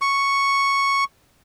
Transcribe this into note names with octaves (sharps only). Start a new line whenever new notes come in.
C#6